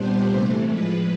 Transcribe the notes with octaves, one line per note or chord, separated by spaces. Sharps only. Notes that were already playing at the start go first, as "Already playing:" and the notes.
Already playing: A#2 G3 B3 D4 C5
C3 E3 A3
A2 F3 G#3 B4